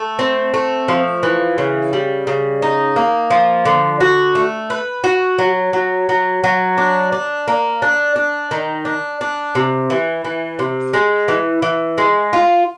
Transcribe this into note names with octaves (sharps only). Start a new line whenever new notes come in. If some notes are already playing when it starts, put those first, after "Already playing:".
Already playing: A3
C4
A3
F3
E3
C#3
G3
C#3
D#4
A#3
F3
D3
F#4
A3
B4
F#4
F#3
F#3
F#3
F#3
D4
D4
A#3
D4
D4
D#3
D4
D4
C3
E3
E3
C3
G#3
E3
E3
G#3
F4